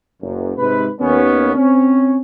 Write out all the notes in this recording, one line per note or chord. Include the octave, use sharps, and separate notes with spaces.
F#1 F#2
G#2 C3 B4
D#2 B3 C#4
C4 C#4